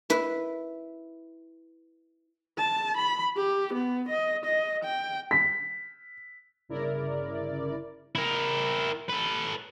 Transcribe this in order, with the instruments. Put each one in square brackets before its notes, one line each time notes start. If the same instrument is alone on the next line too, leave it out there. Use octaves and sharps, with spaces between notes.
[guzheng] E4 B4
[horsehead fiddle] A5
B5
G4
B3
D#5
D#5
G5
[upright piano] B6
[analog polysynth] G1 C#3 E4 A#4 D5
[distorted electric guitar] E4 A#4
A4 B4